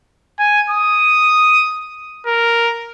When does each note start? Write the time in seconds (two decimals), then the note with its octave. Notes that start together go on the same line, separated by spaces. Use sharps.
0.39 G#5
0.70 D#6
2.27 A#4